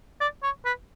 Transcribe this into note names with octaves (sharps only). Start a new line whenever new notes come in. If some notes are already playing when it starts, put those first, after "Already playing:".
D5
C#5
B4